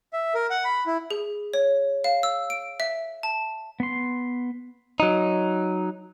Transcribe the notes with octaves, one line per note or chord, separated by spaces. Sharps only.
E5
A#4
F#5
B5
E4
G#4
C#5
F5
E6
D7
E5
A5
B3 C6
F#3 D#4